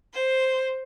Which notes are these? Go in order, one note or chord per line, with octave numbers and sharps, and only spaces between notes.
C5